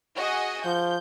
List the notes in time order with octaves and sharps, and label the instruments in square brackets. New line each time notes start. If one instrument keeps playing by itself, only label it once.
[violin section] F#4 G#4 D#5
[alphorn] F3 [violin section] G6